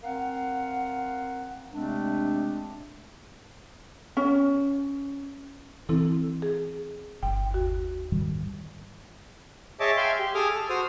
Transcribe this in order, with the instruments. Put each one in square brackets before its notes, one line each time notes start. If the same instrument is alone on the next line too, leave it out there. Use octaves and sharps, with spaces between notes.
[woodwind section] C4 A#4 F5 F#5
C3 G#3 A3 C4 D4
[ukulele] C#4
[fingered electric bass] E3 [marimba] C4 E4 A4
[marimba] G#4
[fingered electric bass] G1 [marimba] G5
[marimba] D#2 F#4
[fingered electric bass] G#2 D#3 G3
[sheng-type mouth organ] G#4 C#5 D#5 E5 A5 D6
E5 F5 G5 G#5 C6
G4
G#4 A4 G#5 D6 D#6 F6
A4
F#4 C5 D#6 F6